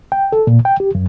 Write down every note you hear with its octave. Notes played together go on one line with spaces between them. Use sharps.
G5
A4
A#2
G5
G4
F#2